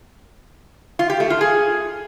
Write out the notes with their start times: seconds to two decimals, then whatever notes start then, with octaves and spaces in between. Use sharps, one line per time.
0.99 F4
1.10 G4
1.20 A3
1.30 F4
1.41 G#4